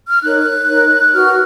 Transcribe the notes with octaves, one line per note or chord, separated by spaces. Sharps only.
F6
D#4 A#4 C#5 F#6
D#4 A#4 C#5
F#4 B4 F6